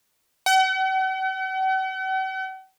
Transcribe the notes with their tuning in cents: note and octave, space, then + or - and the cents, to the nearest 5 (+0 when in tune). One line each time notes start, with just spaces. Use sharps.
F#5 +45